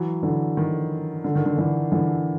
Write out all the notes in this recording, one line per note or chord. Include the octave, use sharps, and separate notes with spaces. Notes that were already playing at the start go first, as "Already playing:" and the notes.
Already playing: E3 F#3
D3 E3
D#3
D3
D#3
D3
D3 E3
D3 E3